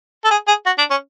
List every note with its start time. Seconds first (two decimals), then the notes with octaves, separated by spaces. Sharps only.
0.25 A4
0.31 G#4
0.48 G#4
0.66 F#4
0.78 D4
0.91 C#4